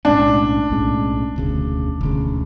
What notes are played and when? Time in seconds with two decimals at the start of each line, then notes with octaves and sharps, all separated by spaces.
0.05 B1 A2 G#3 C#4 D4
0.70 B1 A2 G#3 C#4
1.36 E1 D2 C#3
2.01 E1 D2 C#3